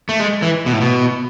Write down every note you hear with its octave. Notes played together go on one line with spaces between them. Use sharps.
A3
G#3
E3
B2
A2
B2